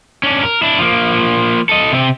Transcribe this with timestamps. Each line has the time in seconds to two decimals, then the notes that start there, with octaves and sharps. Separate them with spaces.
0.23 C#4 D4
0.42 A#4
0.62 D4 E4
0.78 F3 A#3
1.69 A4 D#5
1.92 C3 C4